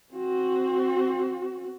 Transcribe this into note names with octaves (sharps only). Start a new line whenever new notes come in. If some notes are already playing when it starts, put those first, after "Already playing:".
C4 F#4